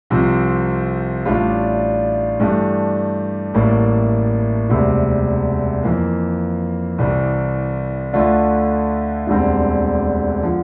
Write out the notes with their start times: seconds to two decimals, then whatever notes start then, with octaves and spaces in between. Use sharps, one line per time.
0.10 C2 C3 F3 C4
1.25 A1 A2 G3 D4 F4
2.40 G2 E3 A3 D4 G4
3.54 A1 A2 G3 A#3
4.69 E1 D2 C3 G3
5.83 F2 E3 A#3
6.98 C2 C3 E3 G3
8.13 D2 D3 A3 D4 F4
9.27 E1 D2 D3 G3 C4
10.42 D3 F3